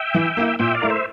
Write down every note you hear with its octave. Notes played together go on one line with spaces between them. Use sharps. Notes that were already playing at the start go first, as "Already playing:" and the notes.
Already playing: E5 G5
E3
A#3 E4
A#2 E5 G5
D5 F5
A3 E4 A#4
C5 E5